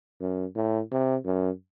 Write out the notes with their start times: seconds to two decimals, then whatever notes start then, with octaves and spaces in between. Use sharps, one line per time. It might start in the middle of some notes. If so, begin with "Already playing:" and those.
0.21 F#2
0.56 A2
0.91 C3
1.25 F#2